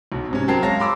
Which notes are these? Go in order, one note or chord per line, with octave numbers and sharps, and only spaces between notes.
B1 B2
G#2 C3 C#4
F#3 C4 A#4 G5 A5 C7
G#3 C#5 F5 A5 A#5 A#6
B5 C6 D6 E6